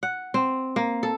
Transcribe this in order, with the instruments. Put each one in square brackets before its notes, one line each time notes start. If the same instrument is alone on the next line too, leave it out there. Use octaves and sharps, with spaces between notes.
[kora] F#5
C4
A#3
A4